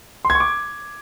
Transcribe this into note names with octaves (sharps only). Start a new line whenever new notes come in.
C6
G#6
C#6
D6